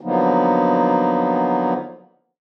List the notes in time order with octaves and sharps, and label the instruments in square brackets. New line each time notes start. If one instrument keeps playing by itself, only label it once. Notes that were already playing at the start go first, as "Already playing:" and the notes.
[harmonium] D3 F3 F#3 A#3 B3 D#4